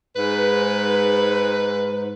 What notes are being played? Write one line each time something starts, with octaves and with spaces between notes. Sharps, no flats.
G#2 B4